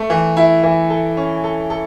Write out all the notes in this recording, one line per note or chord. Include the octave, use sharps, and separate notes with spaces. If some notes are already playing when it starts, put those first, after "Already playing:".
Already playing: A3
E3
E4
E3
A4
C#4
A4
A4